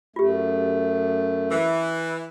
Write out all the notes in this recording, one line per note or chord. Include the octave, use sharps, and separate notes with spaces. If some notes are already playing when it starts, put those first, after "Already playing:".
F#2 A3 F4 G4
E3